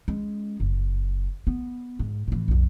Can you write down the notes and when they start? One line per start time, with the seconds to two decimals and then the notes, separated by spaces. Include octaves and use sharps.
0.08 G#3 C#4
0.60 F#1
1.47 B3
1.99 G#2
2.28 A2 E3
2.48 B1 F2